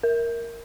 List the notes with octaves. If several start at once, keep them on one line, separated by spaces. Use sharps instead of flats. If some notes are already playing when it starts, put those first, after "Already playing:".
A#4